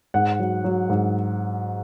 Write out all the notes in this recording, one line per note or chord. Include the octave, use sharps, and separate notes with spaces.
G#2 F#5
F#3
F#3
G#2